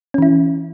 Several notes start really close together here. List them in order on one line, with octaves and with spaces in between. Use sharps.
C#4 E3 E4